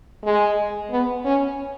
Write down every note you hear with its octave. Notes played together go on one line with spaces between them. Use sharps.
G#3
B3
C#4